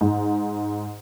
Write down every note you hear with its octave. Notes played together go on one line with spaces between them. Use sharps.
G#2